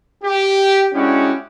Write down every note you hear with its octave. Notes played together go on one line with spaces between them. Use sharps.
G4
G#3 C#4 D4 E4 F#4 G4